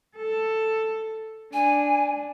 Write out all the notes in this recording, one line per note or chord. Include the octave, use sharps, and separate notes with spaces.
A4
D4 G#5